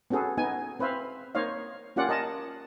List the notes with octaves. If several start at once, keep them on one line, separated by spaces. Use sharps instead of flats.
B3 C#4 F#4 G#4 A4
B3 D#4 G#5
C4 B4 C5 E5 F5
A#3 D#4 C5 C#5 D#5 F5
A#3 C#4 F4 G4 D5 F#5
A#4 D#5 A5